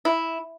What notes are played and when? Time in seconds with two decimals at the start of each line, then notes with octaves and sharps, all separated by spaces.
0.05 E4